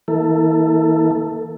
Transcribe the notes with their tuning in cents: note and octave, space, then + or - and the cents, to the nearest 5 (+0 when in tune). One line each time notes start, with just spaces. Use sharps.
E3 -35 A#3 +0 A4 +15